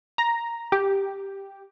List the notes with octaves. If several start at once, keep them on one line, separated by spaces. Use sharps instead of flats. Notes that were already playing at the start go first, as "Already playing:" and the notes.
A#5
G4